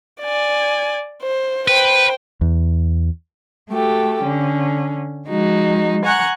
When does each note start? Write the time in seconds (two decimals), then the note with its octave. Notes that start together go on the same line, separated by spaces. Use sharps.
0.21 D5 G#5
1.22 C5
1.68 B4 C5 G5
2.41 E2
3.70 A3 F#4 G4 A4
4.22 D3 C#4
5.28 F3 G#3 D#4 F#4
6.04 F#5 G#5 A#5 C#6 F#6